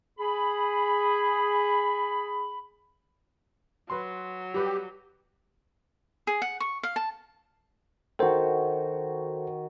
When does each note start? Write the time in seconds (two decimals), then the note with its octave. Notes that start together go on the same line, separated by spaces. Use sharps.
0.19 G#4 B5
3.90 F#3 B4 C6
4.54 G3 G4 B4
6.27 G#4
6.42 F#5
6.60 C#6
6.83 F5
6.96 A5
8.19 D#3 F#4 A4 C5